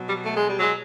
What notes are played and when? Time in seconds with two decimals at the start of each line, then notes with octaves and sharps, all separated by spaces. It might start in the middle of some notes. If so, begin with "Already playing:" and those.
Already playing: B2 F#3
0.08 G3
0.24 A3
0.34 G#3
0.47 G3
0.58 F#3 G#3